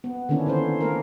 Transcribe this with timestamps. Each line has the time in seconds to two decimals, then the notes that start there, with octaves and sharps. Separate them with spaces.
0.04 B3
0.29 D3 D#3 A#3 C#4 D4 E4
0.46 D3 E3 C#4 C5
0.81 A3 A#3 A#4